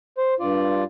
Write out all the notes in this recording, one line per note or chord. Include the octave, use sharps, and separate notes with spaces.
C5
G2 F4 D5